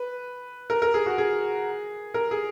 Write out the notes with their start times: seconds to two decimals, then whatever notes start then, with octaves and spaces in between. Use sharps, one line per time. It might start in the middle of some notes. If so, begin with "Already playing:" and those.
Already playing: B4
0.70 A#4
0.82 A#4
0.94 G#4
1.06 F#4
1.18 G#4
2.14 A#4
2.31 G#4